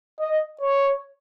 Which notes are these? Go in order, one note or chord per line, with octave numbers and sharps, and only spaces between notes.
D#5
C#5